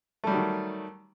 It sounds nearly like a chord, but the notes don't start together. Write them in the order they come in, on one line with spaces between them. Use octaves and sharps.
A3 G3 F#3 D#3